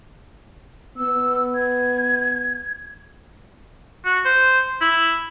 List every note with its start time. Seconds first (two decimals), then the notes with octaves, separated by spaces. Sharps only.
0.97 B3 E6
1.55 G#6
4.05 F#4
4.25 C5
4.81 E4